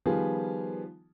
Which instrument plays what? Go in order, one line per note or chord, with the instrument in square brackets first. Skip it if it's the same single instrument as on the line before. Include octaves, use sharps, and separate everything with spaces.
[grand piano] D#3 F3 G3 B3 F4 G#4